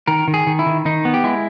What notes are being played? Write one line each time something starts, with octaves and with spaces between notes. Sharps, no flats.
D#3 A#4
D#3
G#4
D#3
E4
D#3
D#3 D#4
B3
G4
G#3 E4